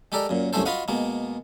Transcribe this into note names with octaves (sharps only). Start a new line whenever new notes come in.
G#3 G4 A4 A#4 D5
F#2 A#2
C2 F#2 A3 C#4 A4 C5
F4 F#4 B4 D#5 F5 F#5
B2 G#3 A#3